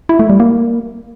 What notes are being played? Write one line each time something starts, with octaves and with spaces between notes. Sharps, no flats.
E4
A3
G3
A#3